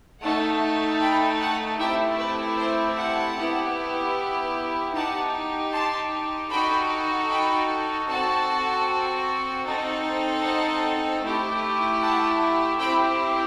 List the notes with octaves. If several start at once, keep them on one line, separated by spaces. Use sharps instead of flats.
A3 D#4 A4 F#5 A5
G5 B5
F#5 A5
A3 C4 E4 G4 E5 G5
B4
C5
F#5 A5
B3 E4 G4
D#4 G4 F#5 A5
A5 C6
D#4 F#4 A4 G5 B5
G5 B5
C4 F#4 A4 F#5 A5
C4 D#4 A4
D#5 F#5
A3 E4 G4
F#5 A5
C4 E4 G4 G5 B5